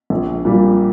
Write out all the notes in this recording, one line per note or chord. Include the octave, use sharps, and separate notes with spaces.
A#1
A#2 G3